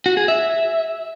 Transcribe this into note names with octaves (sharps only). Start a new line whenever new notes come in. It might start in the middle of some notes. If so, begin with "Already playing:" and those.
F#4
G#4
E5